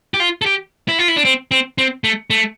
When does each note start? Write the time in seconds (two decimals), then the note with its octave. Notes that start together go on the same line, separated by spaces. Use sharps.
0.14 G4
0.20 F4
0.42 A4
0.46 G4
0.88 E4
0.99 F4
1.08 E4
1.16 D4
1.25 C4
1.51 C4
1.78 C4
2.04 A3
2.30 A3